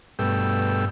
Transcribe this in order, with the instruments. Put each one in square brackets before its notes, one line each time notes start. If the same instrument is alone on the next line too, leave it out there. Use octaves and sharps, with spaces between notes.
[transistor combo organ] G2 B2 A3 G5 E6